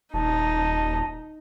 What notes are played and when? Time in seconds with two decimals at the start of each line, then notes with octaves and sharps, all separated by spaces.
0.14 D#1 D#4 A5